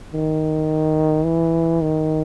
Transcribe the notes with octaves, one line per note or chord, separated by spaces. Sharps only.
D#3
E3
D#3